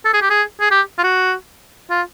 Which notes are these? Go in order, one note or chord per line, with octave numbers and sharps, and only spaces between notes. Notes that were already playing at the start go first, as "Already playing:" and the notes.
A4
G#4
G4
G#4
G#4
G4
F4
F#4
F4